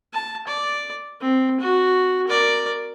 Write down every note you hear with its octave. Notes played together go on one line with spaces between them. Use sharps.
A5
D5
C4
F#4
A#4 D5